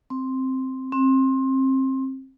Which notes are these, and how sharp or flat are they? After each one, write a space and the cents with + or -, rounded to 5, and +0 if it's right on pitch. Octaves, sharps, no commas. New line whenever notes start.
C4 +0
C4 +25